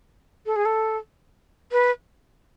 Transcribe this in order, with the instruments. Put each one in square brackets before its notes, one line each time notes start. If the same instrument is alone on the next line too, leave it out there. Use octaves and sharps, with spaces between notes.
[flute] A4
G#4
A4
B4